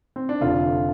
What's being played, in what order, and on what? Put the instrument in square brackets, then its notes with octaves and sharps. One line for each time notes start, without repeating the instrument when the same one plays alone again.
[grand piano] C4
D4
F1 F2 D3 F4